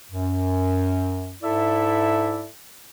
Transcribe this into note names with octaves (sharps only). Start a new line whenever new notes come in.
F#2
G#2 E4 A4 D5 E5